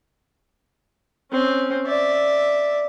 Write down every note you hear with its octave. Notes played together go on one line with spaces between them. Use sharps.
C4 C#4
D5 E5